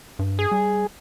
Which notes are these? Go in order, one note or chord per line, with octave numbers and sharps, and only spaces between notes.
G2
G#4
G3